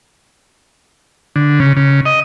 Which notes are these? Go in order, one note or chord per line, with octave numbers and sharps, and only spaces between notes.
D3
C#3
C#3
D#5